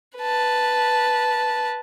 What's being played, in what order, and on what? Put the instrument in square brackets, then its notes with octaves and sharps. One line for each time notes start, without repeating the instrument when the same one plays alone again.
[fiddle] B4 A5